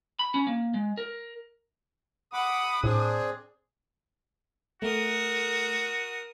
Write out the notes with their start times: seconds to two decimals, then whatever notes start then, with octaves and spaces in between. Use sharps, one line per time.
0.19 B5
0.34 C#4
0.47 A#3
0.74 G#3
0.98 A#4
2.33 F#5 B5 D6 D#6
2.84 A2 C4 D4 G#4
4.82 A3 F#4 A#4 D#6